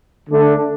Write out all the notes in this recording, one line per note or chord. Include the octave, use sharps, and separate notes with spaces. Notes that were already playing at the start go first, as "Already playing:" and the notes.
D3 A3 D4